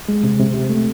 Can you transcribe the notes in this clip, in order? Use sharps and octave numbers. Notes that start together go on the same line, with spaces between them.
G#3
C3
C3
C3
A3